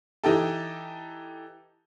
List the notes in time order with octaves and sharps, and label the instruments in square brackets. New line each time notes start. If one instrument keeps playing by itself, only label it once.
[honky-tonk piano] E3 D#4 G4 A4